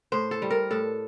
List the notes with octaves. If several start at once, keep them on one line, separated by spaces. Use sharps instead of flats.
A2 C5
A4
G3
A#4
A2 A4